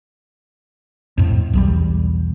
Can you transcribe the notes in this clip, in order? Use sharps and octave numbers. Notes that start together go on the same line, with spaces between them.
F2 A2
B1 E2 G3